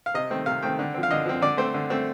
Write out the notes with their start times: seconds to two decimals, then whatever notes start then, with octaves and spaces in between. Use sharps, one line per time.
0.06 F5
0.14 C3 D#5
0.30 D#3 A3 C4
0.46 C3 F5
0.63 D#3 A3 C4 G5
0.79 D3
0.94 F3 C4
1.03 F5
1.11 D3 D#5
1.26 F3 C4
1.42 D3 D5
1.57 A3 C4 C5
1.74 D3
1.90 A3 C4